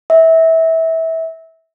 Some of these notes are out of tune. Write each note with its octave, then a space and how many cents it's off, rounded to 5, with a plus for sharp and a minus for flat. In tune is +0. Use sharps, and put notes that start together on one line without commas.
E5 -25